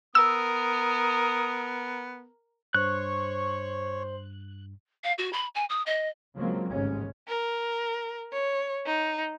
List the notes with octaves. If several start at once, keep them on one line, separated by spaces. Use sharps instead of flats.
B3 A#4 D#6 E6
G2 C5 C#5 C#6 F#6
F5
F#4
B5
G#5
D#6
D#5
C#3 F3 F#3 G#3 A#3 C4
A1 D#2 G#2 C#3 G#3 C#4
A#4
C#5
D#4